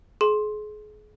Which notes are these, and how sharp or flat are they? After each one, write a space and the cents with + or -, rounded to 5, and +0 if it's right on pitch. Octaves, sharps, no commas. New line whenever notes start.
G#4 +35 C6 +10